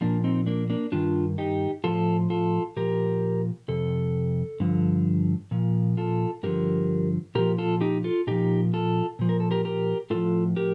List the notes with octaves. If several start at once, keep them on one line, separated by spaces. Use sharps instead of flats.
A#2 F3 A#3 D4
C4 D#4
A#3 D4
A#3 D4
G2 D#3 D4 F4
D#4 G4
A2 F3 F4 A4
F4 A4
A#2 F3 G4 A#4
F2 C3 A4
G2 D3 F3
A#2 F3
F4 A4
G2 D3 F3 G4 A#4
A#2 F3 G4 A#4
F4 A4
D#4 G4
F4 A4
A#2 F3 D#4 G4
F4 A4
A#2 F3
A#4
A4
G4 A#4
G4 A#4
A2 F3 F4 A4
G4 A#4